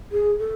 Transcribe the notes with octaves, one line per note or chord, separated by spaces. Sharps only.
G#4
A4